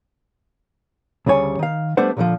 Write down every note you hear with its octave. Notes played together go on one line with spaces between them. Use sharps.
D2 C#3 G3 C#5 G#5
D#3 F5
G3 A3 B3 D4 C5 F#5
A#2 D3 E3 F3